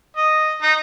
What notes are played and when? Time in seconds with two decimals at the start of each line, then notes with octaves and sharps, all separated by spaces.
0.17 D#5
0.62 D#4